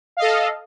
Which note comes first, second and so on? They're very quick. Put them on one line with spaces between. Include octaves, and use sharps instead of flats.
F5 D#5 A4